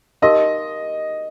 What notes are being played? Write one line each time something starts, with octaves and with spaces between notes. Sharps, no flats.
D#4 G4 A#4 D#5 F5 C6